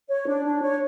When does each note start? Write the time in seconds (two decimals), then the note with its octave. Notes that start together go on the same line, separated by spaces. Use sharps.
0.08 C#5
0.26 D4
0.44 D4
0.62 C#5